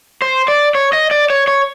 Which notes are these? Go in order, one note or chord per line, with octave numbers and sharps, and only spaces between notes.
C5
D5
C#5
D#5
D5
C#5
C#5